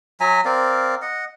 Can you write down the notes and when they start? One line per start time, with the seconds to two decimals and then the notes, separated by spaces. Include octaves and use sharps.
0.20 F#3 E5 G#5 A#5
0.45 C4 A#4 D5 F5
1.02 D#5 F#5